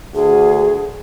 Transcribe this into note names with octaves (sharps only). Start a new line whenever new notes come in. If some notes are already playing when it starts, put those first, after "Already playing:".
D2 G#4